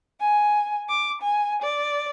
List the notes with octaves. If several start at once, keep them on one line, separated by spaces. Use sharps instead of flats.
G#5
D6
G#5
D5